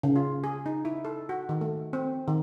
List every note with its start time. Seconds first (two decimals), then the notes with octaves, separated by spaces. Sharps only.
0.03 C#3
0.16 F4
0.44 G#4
0.66 D#4
0.85 E4
1.05 A4
1.29 F#4
1.49 D#3
1.61 A3
1.93 C4
2.28 D#3